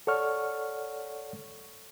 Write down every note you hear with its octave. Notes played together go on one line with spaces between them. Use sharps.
A4 C#5 D5 F#5 C#6 F6